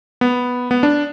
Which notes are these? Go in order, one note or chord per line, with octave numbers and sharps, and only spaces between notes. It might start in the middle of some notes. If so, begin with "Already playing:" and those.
B3
B3
D4